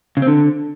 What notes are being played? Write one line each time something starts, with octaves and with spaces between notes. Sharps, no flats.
C#3
C4
D3